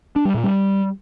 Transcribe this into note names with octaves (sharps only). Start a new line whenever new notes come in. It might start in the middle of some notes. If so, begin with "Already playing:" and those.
D4
G3
A#2
G3